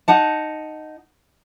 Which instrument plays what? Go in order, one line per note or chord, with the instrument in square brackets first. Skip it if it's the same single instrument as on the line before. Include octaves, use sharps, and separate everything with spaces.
[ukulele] D#4 F#5 A5